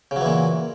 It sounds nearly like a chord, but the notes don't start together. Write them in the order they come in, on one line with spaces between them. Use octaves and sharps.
C#3 F#3 E3 A#2